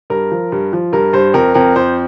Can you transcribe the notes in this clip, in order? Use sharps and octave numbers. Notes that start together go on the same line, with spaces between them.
G2 A#4
F3
G2
F3
G2 A#4
G2 C5
F2 A#4
F2 A#4
F2 C5